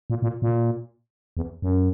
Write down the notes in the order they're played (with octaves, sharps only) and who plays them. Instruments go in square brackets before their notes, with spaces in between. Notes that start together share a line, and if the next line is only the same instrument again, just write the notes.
[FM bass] A#2
A#2
A#2
E2
F#2